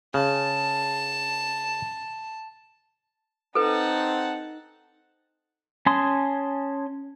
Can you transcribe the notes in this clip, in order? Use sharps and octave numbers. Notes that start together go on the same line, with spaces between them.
C#3 A5
C4 D#4 A4 B4 F#5 A5
C#4 G#5 A5 C6 D#6